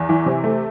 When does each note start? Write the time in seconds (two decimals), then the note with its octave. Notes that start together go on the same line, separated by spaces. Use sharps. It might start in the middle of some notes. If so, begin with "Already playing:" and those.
Already playing: E2
0.09 E3
0.26 C3
0.44 A3